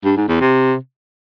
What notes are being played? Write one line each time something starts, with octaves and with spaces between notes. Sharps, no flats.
G2
G#2
E2
C3